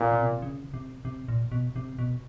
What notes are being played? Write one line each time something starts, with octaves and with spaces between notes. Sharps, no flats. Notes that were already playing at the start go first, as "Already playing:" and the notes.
Already playing: A#2
C3
B2
C3
C#3
C3
C3
A#2
B2
C3
B2